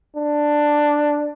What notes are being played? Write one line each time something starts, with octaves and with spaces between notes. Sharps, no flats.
D4